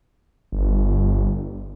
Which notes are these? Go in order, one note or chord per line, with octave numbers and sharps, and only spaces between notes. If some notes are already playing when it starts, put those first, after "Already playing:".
G1